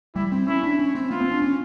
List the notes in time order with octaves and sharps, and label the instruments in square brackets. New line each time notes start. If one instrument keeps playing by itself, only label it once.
[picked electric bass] G3 [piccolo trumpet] E4
[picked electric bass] C4
[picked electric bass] C#4 [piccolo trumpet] E4
[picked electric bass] D4
C#4
C4
[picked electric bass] B3 [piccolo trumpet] F4
[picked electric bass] C4
D4
C#4